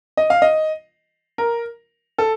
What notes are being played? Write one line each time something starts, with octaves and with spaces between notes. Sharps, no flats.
D#5
F5
D#5
A#4
A4